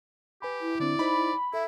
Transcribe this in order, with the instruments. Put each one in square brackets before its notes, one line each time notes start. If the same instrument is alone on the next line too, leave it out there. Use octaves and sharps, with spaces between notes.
[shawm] G4 [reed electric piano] B4 G#5 B5
[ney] E4
[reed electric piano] D3 C4 D4 [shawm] D5
[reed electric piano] D#4 C5 [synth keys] B5
[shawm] E4 [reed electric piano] A4 [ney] E5